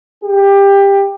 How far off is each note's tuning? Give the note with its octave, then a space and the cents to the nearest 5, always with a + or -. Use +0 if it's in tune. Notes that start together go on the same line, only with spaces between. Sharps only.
G4 +20